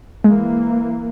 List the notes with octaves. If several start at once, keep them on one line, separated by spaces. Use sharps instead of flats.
E3 G#3 A#3